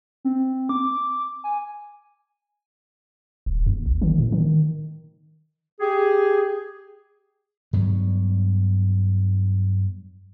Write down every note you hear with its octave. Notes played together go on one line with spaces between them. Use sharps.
C4
D6
G#5
D#1
D#2
G#1
D#3
A2
D#3
G4 G#4
G2 F#3 B3